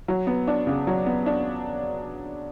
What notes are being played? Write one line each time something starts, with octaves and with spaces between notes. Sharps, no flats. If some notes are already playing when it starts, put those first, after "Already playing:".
F#3
B3
D4
C#3
F#3
B3
D4